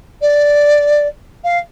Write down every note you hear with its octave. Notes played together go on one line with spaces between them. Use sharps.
D5
F5